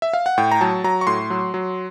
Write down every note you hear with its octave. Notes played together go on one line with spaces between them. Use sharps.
E5
F5
F#5
A2 G5
A#5
F#3 A5
F#3 A#5
C#6
A2 C6
F#3
F#3